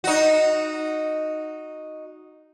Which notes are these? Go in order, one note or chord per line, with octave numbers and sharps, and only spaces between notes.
D#4 F#4